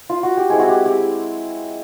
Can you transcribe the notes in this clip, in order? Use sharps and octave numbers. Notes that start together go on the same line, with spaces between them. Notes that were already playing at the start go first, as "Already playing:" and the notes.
F4
F#4
G4
G#3 C4 E4 G#4
F#4
G4
G4